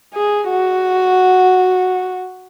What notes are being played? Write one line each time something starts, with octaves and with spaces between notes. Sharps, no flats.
G#4
F#4